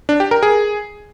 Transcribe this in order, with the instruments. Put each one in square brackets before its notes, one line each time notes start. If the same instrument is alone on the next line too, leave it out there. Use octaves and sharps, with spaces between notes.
[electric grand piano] D4
G4
A#4
G#4